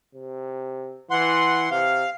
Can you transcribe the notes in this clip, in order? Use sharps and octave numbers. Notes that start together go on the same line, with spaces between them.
C3
E3 F#5 C6
C3 F5